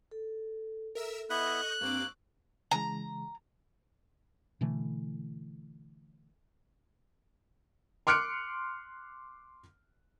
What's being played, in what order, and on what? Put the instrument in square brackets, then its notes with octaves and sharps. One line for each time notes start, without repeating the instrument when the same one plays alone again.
[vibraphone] A4
[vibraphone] A4 [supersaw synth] A#4 E5 E6
[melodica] B3 E4 E5 [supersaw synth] D#5 C#6 G6 [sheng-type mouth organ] F#6
[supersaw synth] G2 C4 D6 [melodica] A#3 [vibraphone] C#6 E6
[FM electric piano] C#3 E3 G#3 [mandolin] A#5
[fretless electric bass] B2 D3 E3 A3
[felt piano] C6 D6 F6 F#6 C#7 D7